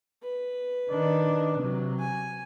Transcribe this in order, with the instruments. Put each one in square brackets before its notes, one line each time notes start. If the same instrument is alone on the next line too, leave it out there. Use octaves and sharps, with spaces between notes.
[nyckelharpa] B4
[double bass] D#3 D4
C3 F#3
[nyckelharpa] G#5